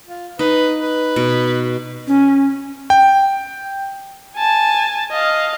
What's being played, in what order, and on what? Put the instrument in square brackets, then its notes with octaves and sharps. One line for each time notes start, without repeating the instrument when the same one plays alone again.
[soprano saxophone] F4
[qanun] D#4 [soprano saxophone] B4
[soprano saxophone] B4
[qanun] B2
[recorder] C#4
[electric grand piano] G5
[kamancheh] G#5 A5
D#5 F5